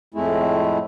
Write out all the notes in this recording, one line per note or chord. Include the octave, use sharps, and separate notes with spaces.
F2 A2 G#3 A3 E4